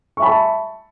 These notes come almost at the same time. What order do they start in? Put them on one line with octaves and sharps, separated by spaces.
C#6 E5 B5 A5